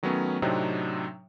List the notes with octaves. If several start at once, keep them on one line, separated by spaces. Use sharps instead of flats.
D#3 F#3 A3 B3 C#4
A2 C3 F#3 C4 D4 D#4